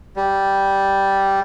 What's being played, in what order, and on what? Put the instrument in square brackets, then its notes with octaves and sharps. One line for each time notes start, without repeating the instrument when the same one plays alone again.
[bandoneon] G3